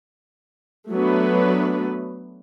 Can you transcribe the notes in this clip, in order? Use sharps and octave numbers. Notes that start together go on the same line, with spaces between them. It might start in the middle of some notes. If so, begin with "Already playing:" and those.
F#3 A3 B3 D4 B4